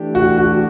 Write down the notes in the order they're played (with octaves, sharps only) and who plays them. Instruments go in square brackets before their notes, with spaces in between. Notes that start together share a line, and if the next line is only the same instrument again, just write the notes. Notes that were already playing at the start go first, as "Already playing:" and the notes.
Already playing: [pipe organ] E3 A3 D4 G4
[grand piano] F#4
F#4